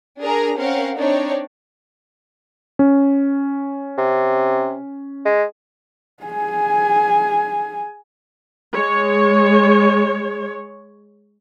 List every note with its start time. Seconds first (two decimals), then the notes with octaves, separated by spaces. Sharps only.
0.20 D4 G#4 A#4 A#5
0.59 C4 C#4 A#4 F5 F#5
0.97 C4 D4 D#4 C#5 D5
2.79 C#4
3.98 C3
5.25 G#3
6.23 G#4 G#5
8.74 G#3 C#5